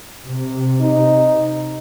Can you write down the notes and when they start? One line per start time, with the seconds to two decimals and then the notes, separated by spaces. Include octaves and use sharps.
0.25 C3
0.80 D#4